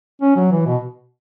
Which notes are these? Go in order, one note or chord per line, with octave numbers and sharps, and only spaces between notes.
C#4
F#3
E3
B2